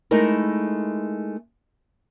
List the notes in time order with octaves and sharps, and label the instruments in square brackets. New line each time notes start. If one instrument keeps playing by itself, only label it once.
[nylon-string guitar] G#3 A3 D#4 E4 A#4